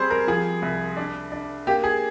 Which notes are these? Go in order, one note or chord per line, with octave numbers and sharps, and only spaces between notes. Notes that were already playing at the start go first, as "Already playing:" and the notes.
Already playing: G3 C4 G#4 C5
A#4
F3 G#4
C2
D4
D4
A#3 G4
G#4